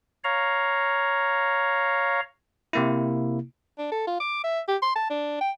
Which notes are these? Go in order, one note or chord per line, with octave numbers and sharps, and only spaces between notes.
C#5 F5 A#5
C3 A#3 E4
D4
A4
F4
D6
E5
G4
C6
A5
D4
G5